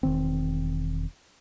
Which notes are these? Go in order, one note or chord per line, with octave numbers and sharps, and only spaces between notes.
E1 D#3 C4